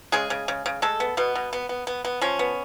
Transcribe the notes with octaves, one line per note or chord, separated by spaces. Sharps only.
C#3 G#3 G#4
C#3
C#3
C#3
G#3 A3 A4
B3
B2 B3
B2
B3
B3
B3
B3
F3 C#4
B3